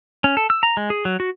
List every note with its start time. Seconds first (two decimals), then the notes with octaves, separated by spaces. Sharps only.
0.24 C#4
0.37 A4
0.50 E6
0.63 A#5
0.77 G#3
0.90 G#4
1.05 F#3
1.20 F#4